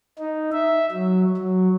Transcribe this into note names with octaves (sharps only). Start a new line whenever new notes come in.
D#4
E5
F#3
F#3